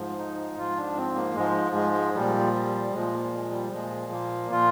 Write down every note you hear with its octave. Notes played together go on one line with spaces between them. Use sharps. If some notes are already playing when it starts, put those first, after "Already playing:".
Already playing: G#2 F3
D#4
G#2 F3 F4
D4
C4
A#3
G#2 F3 G#3
G#3
A#2 F3 G3
G3
A#2 F3 G#3
A#3
G#3
G3
A#2 F3 G#3
A#3
A#2 F3 F4